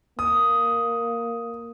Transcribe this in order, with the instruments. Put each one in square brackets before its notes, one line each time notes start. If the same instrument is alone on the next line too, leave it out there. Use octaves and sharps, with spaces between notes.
[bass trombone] A#3 [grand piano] D#6